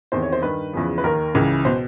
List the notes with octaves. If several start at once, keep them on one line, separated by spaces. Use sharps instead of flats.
E2 C3 D#3 C5
C#5
C5
G2 D#3 B4
E2 C#3 F3
B4
D#2 D#3 A#4
C#2 C#3 E3
B2 C5